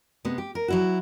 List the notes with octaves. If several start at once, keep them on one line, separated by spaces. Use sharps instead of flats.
C3 G#3 B3
G4
A#4
F#3 E4 F#4